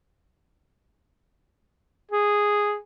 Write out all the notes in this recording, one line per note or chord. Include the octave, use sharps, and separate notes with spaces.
G#4